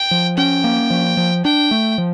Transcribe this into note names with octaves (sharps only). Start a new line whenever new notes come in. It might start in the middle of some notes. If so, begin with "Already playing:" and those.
Already playing: G5
F3
C#4 G5
A#3
F3
F3
D4 G5
A3
F3